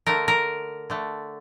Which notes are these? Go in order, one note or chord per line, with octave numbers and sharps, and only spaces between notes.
D3 A3 A#4
A#4
D3 A3